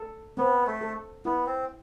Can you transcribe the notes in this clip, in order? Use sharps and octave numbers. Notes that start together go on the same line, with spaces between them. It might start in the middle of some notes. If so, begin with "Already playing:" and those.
Already playing: A4
B3 C4
A3
A4
B3 E4
C4